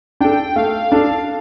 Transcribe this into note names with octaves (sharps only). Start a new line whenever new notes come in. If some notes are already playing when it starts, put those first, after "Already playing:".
D4 A4 G5
A3 F5
D4 A4